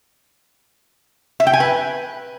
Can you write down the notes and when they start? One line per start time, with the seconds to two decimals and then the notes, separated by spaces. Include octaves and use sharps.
1.40 E5
1.47 G5
1.53 G#5
1.60 B4